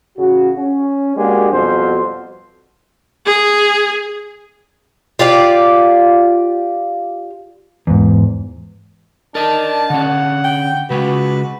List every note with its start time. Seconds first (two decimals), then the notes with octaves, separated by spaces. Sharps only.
0.17 A1 C#3 F#4
0.58 C#4
1.16 G#3 A#3 D4 F#4 G4
1.51 F2 B2 G3 F#4 C5
3.26 G#4
5.19 F4 G4 D5 F5
7.87 E2 G#2
9.35 D4 A#4 D#5 A5
9.90 D3 C#4 F#5
10.44 G5
10.90 C#3 G#3 F#4 B4